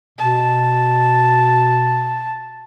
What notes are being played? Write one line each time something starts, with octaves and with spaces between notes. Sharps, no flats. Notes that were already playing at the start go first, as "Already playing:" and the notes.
B2 A5